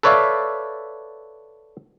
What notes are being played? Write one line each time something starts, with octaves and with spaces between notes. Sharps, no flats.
A4 B4 C#5 D5 E5 F5